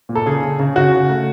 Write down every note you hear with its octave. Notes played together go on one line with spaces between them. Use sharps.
A#2
A4
C#3 G#4
C#3
C#3
C#3 F#4
C#3
A3